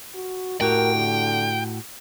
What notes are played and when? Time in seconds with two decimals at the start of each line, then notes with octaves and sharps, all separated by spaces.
0.15 F#4
0.61 A2 F#4 G4 A#4 G5
0.95 D3